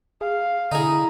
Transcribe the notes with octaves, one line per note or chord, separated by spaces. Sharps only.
G#4 F5
D3 D#4 E4 G#4 A#5